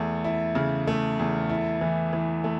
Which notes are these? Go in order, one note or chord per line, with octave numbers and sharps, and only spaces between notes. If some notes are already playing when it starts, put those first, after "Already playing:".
Already playing: E2 A3
E4
C#3
A3
E2
E4
E3
E3
A3